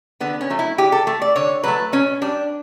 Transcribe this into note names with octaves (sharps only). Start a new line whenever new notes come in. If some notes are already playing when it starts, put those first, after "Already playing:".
D3 B3
C#4
F#3 A3
E4
D3 G4
A4
A3
D5
D3 C#5
F#3 A3 B4
B2 C#4
G3 D4